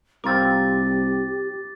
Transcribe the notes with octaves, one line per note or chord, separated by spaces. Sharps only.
C2 C4 F4 G4 A#4 D6 A6